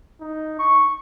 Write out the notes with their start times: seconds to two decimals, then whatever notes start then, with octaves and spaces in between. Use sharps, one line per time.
0.21 D#4
0.59 C#6